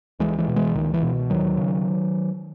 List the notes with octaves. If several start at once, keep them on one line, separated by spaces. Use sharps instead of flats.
C#2 E3 G#3
E3 G#3
B2
E3 G#3
C#2 D#3
E3
B2
D#2 D#3 F#3
C#3